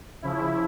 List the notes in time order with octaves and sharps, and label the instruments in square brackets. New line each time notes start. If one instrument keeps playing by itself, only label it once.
[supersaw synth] C#3 F3 E4